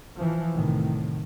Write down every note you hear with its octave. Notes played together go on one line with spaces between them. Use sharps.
E3 F3
C2 A2 D#3